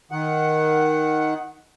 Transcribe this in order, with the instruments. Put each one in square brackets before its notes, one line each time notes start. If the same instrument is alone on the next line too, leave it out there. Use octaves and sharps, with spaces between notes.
[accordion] D#3 F#5